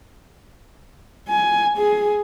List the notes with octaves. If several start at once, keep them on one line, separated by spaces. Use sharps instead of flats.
G#5
G#4